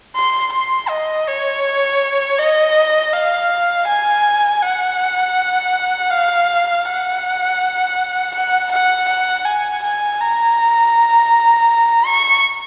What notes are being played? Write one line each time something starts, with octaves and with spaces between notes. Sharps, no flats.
C6
C6
D#5
C#5
D#5
F5
G#5
F#5
F5
F#5
F#5
F#5
F#5
G#5
G#5
A#5
C#6